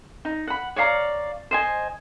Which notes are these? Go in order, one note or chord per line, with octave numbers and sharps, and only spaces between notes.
D#4
F#5 B5
C#5 D5 F5 A#5
C5 D#5 G#5